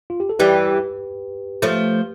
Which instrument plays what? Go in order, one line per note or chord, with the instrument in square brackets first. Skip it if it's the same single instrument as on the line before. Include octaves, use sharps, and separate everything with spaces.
[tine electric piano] F4
G4
A4
[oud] E3 G3 [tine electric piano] G4 B4
[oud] F3 A3